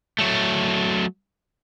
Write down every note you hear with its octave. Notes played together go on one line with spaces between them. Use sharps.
F#3 A3